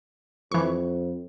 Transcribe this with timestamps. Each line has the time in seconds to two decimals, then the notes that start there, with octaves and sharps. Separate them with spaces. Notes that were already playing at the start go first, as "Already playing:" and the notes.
0.52 F2 E3 C#6